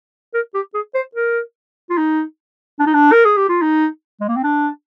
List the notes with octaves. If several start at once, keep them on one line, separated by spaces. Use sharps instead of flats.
A#4
G4
G#4
C5
A#4
F4
D#4
D4
D#4
D4
A#4
G#4
G4
F4
D#4
G#3
A#3
C4
D4